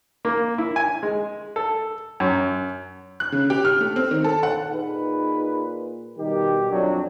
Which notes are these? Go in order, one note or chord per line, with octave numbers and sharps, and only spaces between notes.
A#3
E4
G#5
G#3
A4
F#2
F#6
C#3
G4
F6
A3
C4
D#3
A4
F#5
A#2 D#4 G#4 B4
B2 D#3 G3 G4
F2 F#3 D4